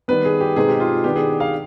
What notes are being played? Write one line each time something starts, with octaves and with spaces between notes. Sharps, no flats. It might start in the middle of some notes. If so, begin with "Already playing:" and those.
D#3 G3 B3 B4
G#4
G4
B2 G#3 C4 D#4 G#4
G4
F4
D#3 B3 D4 G4
G#4
F5